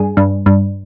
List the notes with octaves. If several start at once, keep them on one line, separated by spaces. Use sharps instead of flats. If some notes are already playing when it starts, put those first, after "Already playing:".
Already playing: G2 G#4
G2
G2